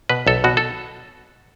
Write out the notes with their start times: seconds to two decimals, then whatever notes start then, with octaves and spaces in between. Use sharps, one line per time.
0.09 B2 B4
0.27 B1 A4
0.44 B2 F#4
0.57 A4